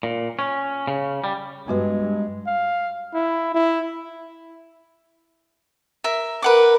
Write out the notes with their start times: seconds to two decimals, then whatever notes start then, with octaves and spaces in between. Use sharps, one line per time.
0.03 A#2
0.39 C#4
0.87 C#3
1.24 G3
1.68 G2 G#3 B3 F#4 B4
2.46 F5
3.14 E4
3.55 E4
6.04 A#4 E5
6.42 A#4 B4 F#5 D6